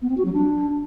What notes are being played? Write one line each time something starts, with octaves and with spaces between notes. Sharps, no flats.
B3
C4
F#4
F#3
D4